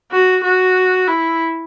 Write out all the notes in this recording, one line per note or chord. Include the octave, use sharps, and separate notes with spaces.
F#4
F#4
E4